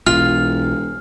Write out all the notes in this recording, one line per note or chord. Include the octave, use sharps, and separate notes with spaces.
E1 B1 B2 F4 F6